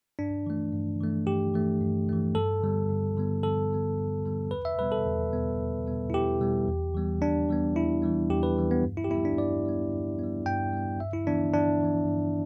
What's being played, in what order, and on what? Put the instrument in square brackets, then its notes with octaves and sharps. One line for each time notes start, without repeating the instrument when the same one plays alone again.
[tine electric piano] G2 D4
E3 A3
G2
E3 A3
G2 G4
E3 A3
G2
E3 A3
G2 A4
D3 G3 B3
G2
D3 G3 B3
G2 A4
D3 G3 B3
G2
D3 G3 B3
E2 B4
E5
B2 G3 B3 B4
A4
E2
B2 G3 B3
E2
B2 G3 B3
E4
E2 G4
B2 G3 B3
E2
E3 G3 B3
E2 D4
E3 G3 B3
E2 E4
E3 G3 B3
E2 G4
B4
E3 G3 B3
B3
G2
E4
G4
G3 B3 E4
D4
G2 D5
G3 B3
G2
G3 B3
G2 G5
G3 B3
G2 E5
E4
E3 B3 D4
G2 D4
E3 B3
G2